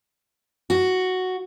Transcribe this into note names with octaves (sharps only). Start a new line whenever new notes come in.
F#4